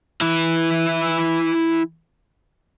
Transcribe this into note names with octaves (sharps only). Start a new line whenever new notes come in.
E3 E4